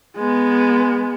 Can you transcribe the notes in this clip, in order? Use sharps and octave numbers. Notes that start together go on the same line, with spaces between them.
G#3 B3